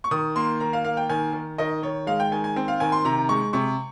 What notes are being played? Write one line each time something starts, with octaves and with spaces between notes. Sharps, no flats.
C#6
D#3 D#6
A#3 C6
D#3 A#5
F5
A#3 F5
G5
D#3 G#5
D#3
D#3 D#5
D#3 C#5
G#3 F5
G5
D#3 G#5
G#5
C4
F5
D#3 G#5
C6
C3 A#5
G#3 C#6
C3 C#6